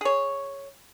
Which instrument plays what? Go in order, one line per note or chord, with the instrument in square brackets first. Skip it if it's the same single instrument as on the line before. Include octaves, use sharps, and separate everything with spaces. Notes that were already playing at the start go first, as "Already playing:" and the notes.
[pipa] G#4 C#5